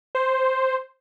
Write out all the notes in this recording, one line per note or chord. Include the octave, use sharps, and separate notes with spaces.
C5